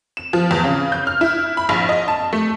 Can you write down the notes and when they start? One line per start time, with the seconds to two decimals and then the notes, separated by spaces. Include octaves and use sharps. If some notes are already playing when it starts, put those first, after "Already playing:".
0.17 E7
0.33 F3
0.51 E2
0.64 C#3
0.92 G6
1.07 F6
1.21 E4
1.57 B5
1.69 A#1
1.89 D#5
2.08 A5
2.33 A3